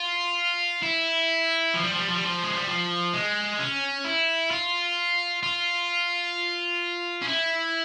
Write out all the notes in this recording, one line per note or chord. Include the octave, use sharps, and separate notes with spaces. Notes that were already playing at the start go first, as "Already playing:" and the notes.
Already playing: F4
E4
F3
G3
F3
G3
F3
G3
F3
G#3
G3
F3
G#3
C#4
E4
F4
F4
C#4
E4